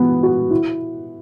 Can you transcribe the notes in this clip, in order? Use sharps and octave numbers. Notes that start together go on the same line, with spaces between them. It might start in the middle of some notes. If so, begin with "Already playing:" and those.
Already playing: E3 B3 F#4
F#4
E4